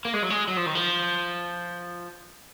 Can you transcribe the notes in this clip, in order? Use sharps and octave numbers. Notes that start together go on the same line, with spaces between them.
A#3
G#3
F#3
G#3
F#3
F3
D#3
F3